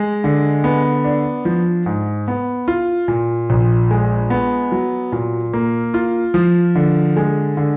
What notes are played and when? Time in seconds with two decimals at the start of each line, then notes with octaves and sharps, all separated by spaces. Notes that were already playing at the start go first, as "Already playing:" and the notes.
Already playing: G#3
0.24 D3
0.64 B3
1.04 D4
1.45 F3
1.86 G#2
2.28 B3
2.68 F4
3.08 A#2
3.50 A#1
3.91 G#3
4.30 B3
4.72 F#3
5.12 A#2
5.53 A#3
5.94 F4
6.34 F3
6.75 D3
7.17 G#3
7.57 D3